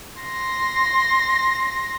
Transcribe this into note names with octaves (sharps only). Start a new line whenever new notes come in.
C6 A#6